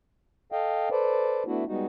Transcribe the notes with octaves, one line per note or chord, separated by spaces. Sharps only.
A4 D#5 F5 G5
A4 B4 C5 D5
A3 B3 D4 E4 F#4
G3 G#3 B3 D#4 F#4